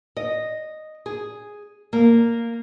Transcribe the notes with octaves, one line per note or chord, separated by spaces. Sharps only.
D#5
G#4
A#3